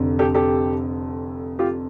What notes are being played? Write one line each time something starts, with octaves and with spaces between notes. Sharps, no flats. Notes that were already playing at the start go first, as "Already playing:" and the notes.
Already playing: F1 F2 D3
G4 A4
G4 A4
F4 G4